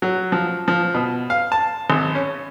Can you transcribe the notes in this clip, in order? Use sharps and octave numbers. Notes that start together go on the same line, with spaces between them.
F#3
F3
F3
B2
F5
A5
G#1
C#4